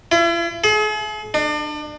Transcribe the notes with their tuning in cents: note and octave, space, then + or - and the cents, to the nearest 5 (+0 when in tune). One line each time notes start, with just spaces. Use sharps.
E4 +45
G#4 +45
D4 +35